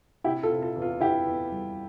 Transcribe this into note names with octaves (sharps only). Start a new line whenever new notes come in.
C3 E4 G4
F4 A4
C3
F4 A4
E2
F4
E2 E4 G4
E2
G3